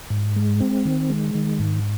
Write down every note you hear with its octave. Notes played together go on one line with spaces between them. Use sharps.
G#2
G#3
C4
D#3
G#3
D#3
G#2